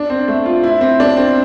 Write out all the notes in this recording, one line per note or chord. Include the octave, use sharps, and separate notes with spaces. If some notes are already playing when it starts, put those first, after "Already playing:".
Already playing: D4
C4
A3
F4
E4
C4
D4
C4